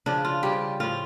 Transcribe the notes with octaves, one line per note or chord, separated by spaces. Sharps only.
C#3 F3 D4
F4
C#3 G3 G4
A2 F3 F4